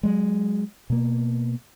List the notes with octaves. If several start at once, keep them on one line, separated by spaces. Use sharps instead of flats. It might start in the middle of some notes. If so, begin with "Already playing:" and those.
F#3 G#3
B2 A#3